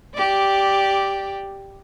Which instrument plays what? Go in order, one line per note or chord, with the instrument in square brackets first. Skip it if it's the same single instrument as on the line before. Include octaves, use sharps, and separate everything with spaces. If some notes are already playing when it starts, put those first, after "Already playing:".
[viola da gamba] G4 D5